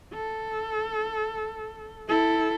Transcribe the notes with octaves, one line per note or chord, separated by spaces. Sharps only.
A4
E4 A4